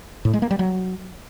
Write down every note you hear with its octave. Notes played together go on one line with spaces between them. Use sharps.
A2
G#3
A#3
G3
F#3